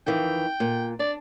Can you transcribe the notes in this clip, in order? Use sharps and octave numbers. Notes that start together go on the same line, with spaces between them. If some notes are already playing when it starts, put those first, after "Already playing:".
F2 D#3 E3 G5
A#2
D4 D5